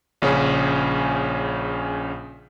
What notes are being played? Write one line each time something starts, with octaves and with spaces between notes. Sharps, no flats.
A#1 C#3 C#4 G#4